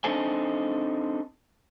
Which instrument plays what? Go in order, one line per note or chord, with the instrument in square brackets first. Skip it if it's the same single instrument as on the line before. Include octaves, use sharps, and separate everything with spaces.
[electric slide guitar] C4 D4 D#4 A4 C5 G#5